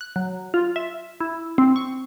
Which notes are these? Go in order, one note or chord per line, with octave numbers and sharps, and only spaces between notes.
F#6
F#3
F4
E5
E4
C4
C#6